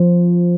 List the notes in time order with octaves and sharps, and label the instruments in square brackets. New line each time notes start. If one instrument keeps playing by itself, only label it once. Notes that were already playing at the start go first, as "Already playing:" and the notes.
Already playing: [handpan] F3